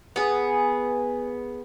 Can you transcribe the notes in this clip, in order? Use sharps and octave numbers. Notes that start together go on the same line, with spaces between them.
B3 G#4